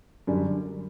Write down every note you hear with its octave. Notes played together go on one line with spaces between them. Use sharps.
F#2 D3 G3